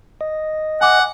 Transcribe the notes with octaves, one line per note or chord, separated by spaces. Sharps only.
D#5
F#5 G#5 D6